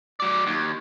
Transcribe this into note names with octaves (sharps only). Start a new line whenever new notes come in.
F#3 D5
D#2